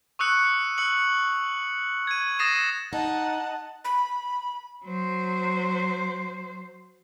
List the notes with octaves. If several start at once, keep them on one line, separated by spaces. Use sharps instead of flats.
C#6 D#6 E6 F#6 C#7
E6 C#7 F#7
G#6 D#7
D#6 A6 A#6 C7 D#7 E7
D#4 D#5 F#5 A5
B5
F#3 C5